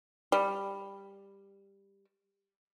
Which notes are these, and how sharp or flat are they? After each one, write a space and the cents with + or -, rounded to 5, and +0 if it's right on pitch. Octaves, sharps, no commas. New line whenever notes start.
G3 +10